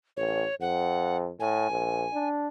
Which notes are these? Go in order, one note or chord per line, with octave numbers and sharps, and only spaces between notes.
A1 C#5
F2 F#5
A2 G#5
A#1
D4